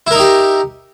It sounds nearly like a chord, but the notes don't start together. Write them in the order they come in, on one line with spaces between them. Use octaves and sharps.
E4 A#4 D#4 G4